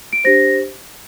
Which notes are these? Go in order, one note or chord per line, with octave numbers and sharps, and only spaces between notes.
D7
D4 G4 C5 A#6